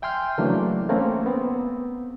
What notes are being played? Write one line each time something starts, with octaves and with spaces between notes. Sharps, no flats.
E5 G5 G#5 C6 F6 G6
C#3 E3 F#3 A3 A#3 D4
A3 A#3 C4 C#4
B3 C4